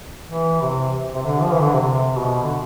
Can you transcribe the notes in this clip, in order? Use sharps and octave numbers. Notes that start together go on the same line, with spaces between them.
E3
C3
C3
D3
F3
E3
D3
C3
B2
D3